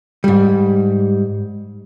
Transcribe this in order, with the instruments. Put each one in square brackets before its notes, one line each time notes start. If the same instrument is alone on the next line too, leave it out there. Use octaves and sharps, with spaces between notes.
[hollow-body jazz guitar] G#2 G3